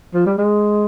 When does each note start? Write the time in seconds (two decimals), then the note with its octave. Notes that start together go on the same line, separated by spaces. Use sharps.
0.14 F3
0.26 G3
0.38 G#3